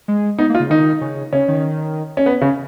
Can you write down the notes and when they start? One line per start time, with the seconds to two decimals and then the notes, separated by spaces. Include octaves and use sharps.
0.08 G#3
0.38 B3 D#4
0.50 A#3
0.55 F4
0.60 C#3
0.70 D#3 D#4
1.01 C#3
1.33 C#3 C#4
1.48 D#3
2.17 C#4
2.26 B3
2.41 C#3